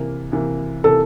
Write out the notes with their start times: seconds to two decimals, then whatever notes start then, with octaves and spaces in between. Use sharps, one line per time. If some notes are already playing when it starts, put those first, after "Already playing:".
Already playing: C3 E3 A#3
0.32 C3 E3 A#3
0.83 C3 E3 A#3 A4